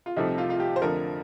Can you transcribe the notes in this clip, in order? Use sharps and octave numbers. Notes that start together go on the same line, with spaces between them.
F4
C2 C3 F3 A3 D#4
F4
F4
G4
C5
F2 D3 F3 A3 A#4